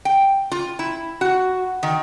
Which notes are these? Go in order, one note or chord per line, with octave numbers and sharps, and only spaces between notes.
G5
F4
E4
F#4
D#3